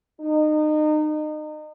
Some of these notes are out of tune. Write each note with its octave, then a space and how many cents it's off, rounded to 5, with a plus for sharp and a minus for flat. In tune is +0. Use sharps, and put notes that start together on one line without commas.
D#4 -30